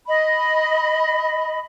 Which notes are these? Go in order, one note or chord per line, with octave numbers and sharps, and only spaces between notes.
D#5 B5